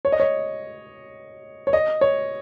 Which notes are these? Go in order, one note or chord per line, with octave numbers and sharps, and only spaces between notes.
C#5
D#5
C#5
C#5
D#5
C#5